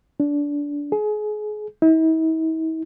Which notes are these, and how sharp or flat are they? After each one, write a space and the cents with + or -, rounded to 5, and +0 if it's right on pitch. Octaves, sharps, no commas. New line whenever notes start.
D4 -20
G#4 +30
E4 -45